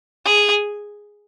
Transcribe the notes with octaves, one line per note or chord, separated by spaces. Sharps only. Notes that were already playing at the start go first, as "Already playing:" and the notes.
G#4